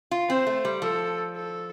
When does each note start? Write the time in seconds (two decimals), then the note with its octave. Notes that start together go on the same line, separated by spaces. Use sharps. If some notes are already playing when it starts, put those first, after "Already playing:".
0.11 F4
0.29 C4 C5
0.47 A3
0.65 G3
0.82 F3 A4
1.35 A4